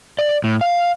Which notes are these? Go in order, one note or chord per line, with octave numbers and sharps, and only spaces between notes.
D5
A2
F5